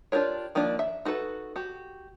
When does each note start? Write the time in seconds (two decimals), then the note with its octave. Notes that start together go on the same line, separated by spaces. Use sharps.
0.12 D4 F4 G4 A#4 C#5
0.55 D#3 F3 A#3 D4
0.79 E5
1.05 D#4 F#4 A4 B4
1.56 F#4 G4